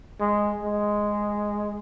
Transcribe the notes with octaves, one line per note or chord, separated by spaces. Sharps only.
G#3
G#3